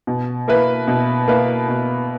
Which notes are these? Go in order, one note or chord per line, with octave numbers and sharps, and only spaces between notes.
B2
A#3 E4 B4
B2
A#3 E4 B4
B2